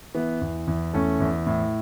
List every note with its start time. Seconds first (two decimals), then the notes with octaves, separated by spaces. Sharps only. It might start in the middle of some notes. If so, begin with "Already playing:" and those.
0.14 E3 B3
0.41 E2
0.67 E2
0.93 E2 A3 C#4
1.20 E2
1.47 A2